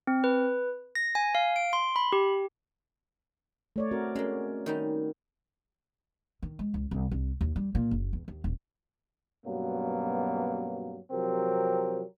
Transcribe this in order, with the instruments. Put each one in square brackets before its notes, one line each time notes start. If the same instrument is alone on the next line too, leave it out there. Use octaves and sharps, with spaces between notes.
[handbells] C4
B4
A#6
G#5
F5
D7
C6
B5
G4
[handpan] A3 C#5 D5
C4 F#4 A#4
[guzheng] G#3 A#3 [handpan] C#4
[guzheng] D#3 G3 D#4
[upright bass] D#3
G#3
C#2
C2
C2
D#2
G3
A#2
F#1
E2
D#2
D#1
[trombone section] G2 B2 F#3 A#3 B3 C#4
C3 F3 F#3 C4 G4 A#4